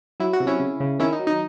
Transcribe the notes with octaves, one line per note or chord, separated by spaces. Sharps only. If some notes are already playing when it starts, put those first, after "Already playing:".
F#3 E4
F#4
C3
C#4 E4
C#3
C#3
D#3 C#4 E4
D#4
F#3
D#4